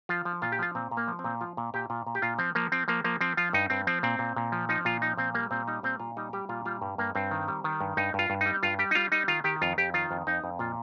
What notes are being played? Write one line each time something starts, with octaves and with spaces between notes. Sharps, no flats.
F3 F4
F3
A#2 F4
G4
F3 F4
A#2 C4
A#2
A#3
F3
C4
A#2
F3 F4
A#2
A#2 G4
A#2 F4
A#2
G4
A#2 F4
F3 C4
F3 A#3
F3 C4
F3 A#3
F3 A#3
F3 C4
F3 F4
G2 D#4
G2 C4
F3 C4
A#2 C4
A#2
A#2
F3
F3 D#4
A#2 F4
F3 D#4
A#2 C4
G3 A#3
A#2 C4
G3 D#4
A#2 C4
A#2 F4
G3 D#4
G3 G4
A#2 F4
G3 F4
G2
G2 A#3
G2 C4
D#3
G3
D#3
G2
G2 D#4
G2 F4
G2
G3 D#4
G2 F4
G3 G4
D#4
G3 F4
G3 D#4
D#3 F4
D#3 G4
F2 F4
F2 G4
D#3 F4
F2
F2 D#4
F2
A#2 F4